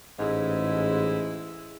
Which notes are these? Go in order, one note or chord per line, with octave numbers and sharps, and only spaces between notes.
A1 G#2 G#3 E4